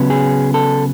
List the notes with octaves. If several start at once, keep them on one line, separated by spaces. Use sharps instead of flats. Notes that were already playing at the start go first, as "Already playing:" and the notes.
Already playing: C#3 F#3 B3
G#4
A4